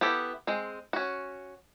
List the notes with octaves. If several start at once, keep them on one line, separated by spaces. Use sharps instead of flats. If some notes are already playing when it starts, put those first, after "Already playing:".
B3 E4 G4 A4
G#3 C4
C#4 F#4